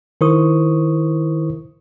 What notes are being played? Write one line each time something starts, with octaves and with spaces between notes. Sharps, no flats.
D#3 E4 A#4 C5 C#6 D#6